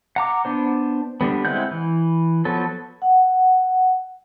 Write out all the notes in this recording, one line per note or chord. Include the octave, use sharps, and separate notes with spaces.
F#5 A#5 D6
B3 D4 C5
D3 G3 B3
G#3 C4 E4 F#5 G6
E3
F3 F#3 B3 A4
F#5